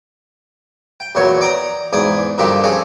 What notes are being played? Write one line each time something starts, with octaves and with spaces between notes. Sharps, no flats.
G5
E2 A#2 F#3 C#5
D5 G5 A#5 D#6
E2 G#2 D5 G#5 D#6
G2 A#2 D3 F3 D#4 G4
C4 C#4 G#4 A4